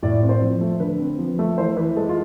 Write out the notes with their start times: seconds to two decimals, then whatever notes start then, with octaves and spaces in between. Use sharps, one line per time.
0.03 A2 D5
0.15 D5
0.22 C4
0.29 C5
0.42 F3
0.61 A3
0.80 D3 B4
0.99 C4
1.19 F3
1.39 A3
1.57 E3 C5
1.77 E3 B4
1.96 G#3 A4
2.09 F4